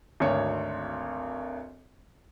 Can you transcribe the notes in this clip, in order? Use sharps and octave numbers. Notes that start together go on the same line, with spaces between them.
G#1 D2 C#5